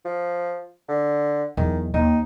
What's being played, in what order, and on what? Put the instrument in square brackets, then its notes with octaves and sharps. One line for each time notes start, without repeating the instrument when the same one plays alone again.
[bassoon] F3
D3
[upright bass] E2 F#3 [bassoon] D#3
[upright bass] D#2 [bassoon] D#4